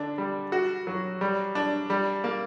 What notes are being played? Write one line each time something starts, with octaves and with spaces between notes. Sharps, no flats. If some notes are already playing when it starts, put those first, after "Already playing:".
Already playing: D3 D4
G3
F#4
F#3
G3
D4
G3
A#3